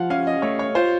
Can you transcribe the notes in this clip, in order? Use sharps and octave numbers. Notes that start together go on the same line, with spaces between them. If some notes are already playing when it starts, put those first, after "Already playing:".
Already playing: F3 F5 F#5
C#4 F5
D#5
A3 C#5
C#5
F4 C5